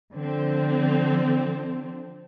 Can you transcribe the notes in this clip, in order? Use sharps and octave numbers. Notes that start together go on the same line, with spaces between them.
D3 F3 C4